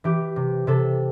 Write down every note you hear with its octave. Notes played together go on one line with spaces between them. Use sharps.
E3 G4
C3
C3 A4